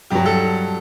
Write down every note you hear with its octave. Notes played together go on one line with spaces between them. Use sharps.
G2 F#3 G4
A4